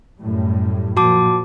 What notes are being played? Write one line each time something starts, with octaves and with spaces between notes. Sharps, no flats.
F#2 A2 G3
A#2 F3 F#4 A5 D6